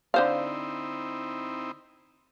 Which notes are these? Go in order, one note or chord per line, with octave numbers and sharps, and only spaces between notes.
D3 C4 D#4 E4 C5 F5